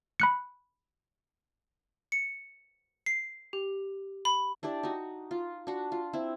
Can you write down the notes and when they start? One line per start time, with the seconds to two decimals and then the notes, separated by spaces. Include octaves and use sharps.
0.20 B5 F#6 C#7
2.12 C#7
3.06 C7
3.53 G4
4.25 B5
4.63 D4 E4 G4 D5
4.83 D#4 F#4
5.31 F4
5.67 D4 F#4
5.92 F4
6.13 C4 E4